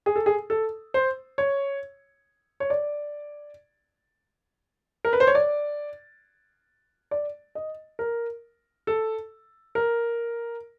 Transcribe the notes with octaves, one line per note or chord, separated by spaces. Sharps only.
G#4
A4
G#4
A4
C5
C#5
C#5
D5
A#4
B4
C5
C#5
D5
D5
D#5
A#4
A4
A#4